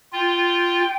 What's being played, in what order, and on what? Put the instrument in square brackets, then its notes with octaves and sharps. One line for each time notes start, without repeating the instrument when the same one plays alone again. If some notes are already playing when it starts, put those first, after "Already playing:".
[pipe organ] F4 [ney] G5